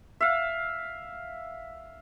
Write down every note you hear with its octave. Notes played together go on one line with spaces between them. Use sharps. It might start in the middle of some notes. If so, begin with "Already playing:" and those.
E5 F5